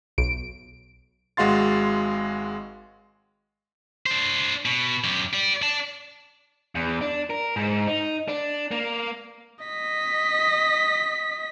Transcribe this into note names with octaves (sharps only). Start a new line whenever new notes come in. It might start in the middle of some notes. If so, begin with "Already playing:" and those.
B1 D7
G#1 G#3 F#4 F5 C6 A6
D4 C5
B2
F#2 G4
G4 D5
D5 A5
E2
D4
A#4
G#2
D#4
D4
A#3
D#5 B6